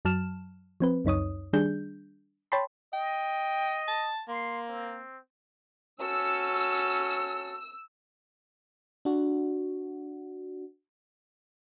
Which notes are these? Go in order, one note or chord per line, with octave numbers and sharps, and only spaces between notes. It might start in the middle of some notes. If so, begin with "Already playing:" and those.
F#2 F#3 A5 F6 E7
F3 C4 B4
C#2 F#2 D#4 C#5 D#6
D#3 G3 D4 G#4 G6
C#5 G5 A5 B5 C6
D#5 G5
A5
A#3 C6
C4
C#4 F#4 A4 E6
D4 F#4